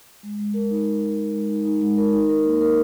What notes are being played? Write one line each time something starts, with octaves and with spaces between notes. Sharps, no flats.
G#3
G#3
A#4
D#4
D#4
G#3
A#4
G#3
D#4
D#4
G#3
A#4
D#4
A#4
A#3
A#4